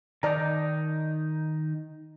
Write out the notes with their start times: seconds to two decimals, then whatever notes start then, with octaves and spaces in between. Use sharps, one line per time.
0.23 D#3 D#4 D5 A5 A#5